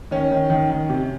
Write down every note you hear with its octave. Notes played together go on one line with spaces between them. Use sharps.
D#3 C#4
D#3
D#3
D#3
C3